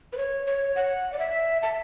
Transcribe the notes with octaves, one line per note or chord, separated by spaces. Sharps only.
B4
C#5
C#5
F#5
D5
E5
A5